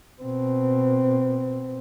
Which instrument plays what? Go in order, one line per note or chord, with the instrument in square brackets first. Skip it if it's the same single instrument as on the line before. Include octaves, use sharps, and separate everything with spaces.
[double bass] B2 C4